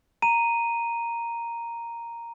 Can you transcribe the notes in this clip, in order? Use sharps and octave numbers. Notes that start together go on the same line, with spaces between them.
A#5 D#7